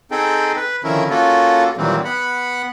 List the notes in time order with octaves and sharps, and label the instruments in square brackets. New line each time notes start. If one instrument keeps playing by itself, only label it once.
[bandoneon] C4 D#4 G#4 A4 G5
B4
D3 D#3 F3 C#4 E4 A#4
A#3 C#4 F4 F#4 A4
A#2 D#3 E3 F#3 G3 C4
B3 F#5 B5